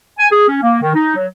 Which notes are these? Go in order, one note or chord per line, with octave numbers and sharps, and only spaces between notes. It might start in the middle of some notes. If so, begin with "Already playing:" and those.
G#5
G#4
C#4
A#3
D#3
D#4
F#3